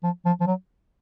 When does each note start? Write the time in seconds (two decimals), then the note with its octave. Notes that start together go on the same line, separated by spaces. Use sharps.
0.03 F3
0.25 F3
0.40 F3
0.47 F#3